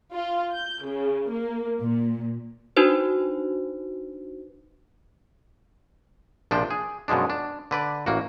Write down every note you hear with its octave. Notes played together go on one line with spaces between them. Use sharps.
F4
G6
C#3
A#3
A#2
D4 D#4 F#4 B4 C5
A#1 C3 F3 D4 C5 G5
G#4
F#2 B2 F3 G#3 D4
D4
D3 B4 D5
A1 A#3 F#4